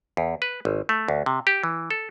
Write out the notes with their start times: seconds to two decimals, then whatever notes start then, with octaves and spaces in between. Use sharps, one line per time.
0.17 E2
0.42 B4
0.65 G#1
0.89 A3
1.08 D2
1.26 C3
1.47 G4
1.63 E3
1.90 A4